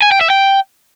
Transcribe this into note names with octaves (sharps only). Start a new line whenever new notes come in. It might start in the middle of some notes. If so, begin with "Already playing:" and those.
G#5
G5
E5
G5